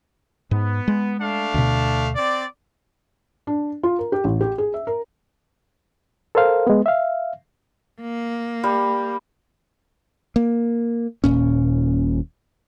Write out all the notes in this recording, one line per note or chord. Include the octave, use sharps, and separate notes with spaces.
G#2 B3
G#3
A3 D4 F5
D2 B2
C4 D5
D4
F4
A#4
G4
A1
G4
G#4
E5
A#4
A4 A#4 C5 F5
G#3 B3
E5 F5
A#3
G3
A#3
D#1 A#2 C#4